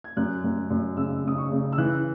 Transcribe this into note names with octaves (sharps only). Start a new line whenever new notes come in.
G#6
F#2 F#6
F#2
F#2
C#3 E6
C#3 D#6
C#6
C#3
E6
E3 F#6